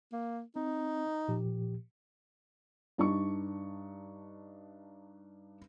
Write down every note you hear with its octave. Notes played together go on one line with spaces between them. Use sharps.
A#3
C4 D#4
A#2 F3 G4
G2 D4 D#4 C#6